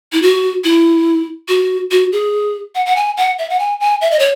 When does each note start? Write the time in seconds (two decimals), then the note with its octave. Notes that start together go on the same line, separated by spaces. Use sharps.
0.12 E4
0.22 F#4
0.64 E4
1.49 F#4
1.91 F#4
2.12 G#4
2.75 F#5
2.86 F#5
2.96 G#5
3.17 F#5
3.39 E5
3.50 F#5
3.59 G#5
3.80 G#5
4.01 E5
4.11 D#5
4.19 C#5